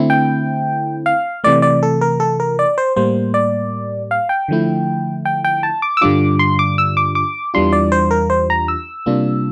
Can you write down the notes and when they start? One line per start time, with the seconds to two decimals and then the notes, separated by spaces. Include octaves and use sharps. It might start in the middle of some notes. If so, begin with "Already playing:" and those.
Already playing: D3 A3 C4 E4
0.10 G5
1.06 F5
1.44 C3 E3 A3 D5
1.62 D5
1.83 A4
2.01 A#4
2.20 A4
2.40 A#4
2.59 D5
2.78 C5
2.96 A2 G3 A#3 C5
3.34 D5
4.11 F5
4.29 G5
4.48 D3 F3 A3 E4
5.25 G5
5.44 G5
5.63 A5
5.82 D6
5.97 E6
6.01 G2 D3 G3 D4 F4 D6
6.39 C6
6.59 D6
6.78 E6
6.97 D6
7.15 D6
7.54 E2 E3 G3 D4 F4 C6
7.73 D5
7.92 C5
8.11 A#4
8.30 C5
8.50 A#5
8.68 E6
9.06 C3 G3 A#3 D4 F4